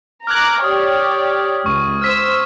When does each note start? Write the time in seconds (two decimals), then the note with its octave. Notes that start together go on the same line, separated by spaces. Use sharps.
0.27 A#5 D6 F6 F#6 G#6
0.64 G4 C#5 D5 D#6
1.66 C#2 C#6 D#7
2.02 C5 E6 F6 B6 D#7